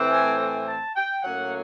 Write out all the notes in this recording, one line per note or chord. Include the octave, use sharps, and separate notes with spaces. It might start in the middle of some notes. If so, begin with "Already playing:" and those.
Already playing: A2 E3 A3 C4
G#5
G#5
A5
G5
A2 F#3 A#3 C#4 F#5